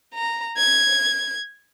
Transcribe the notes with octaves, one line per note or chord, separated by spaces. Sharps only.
A#5
G#6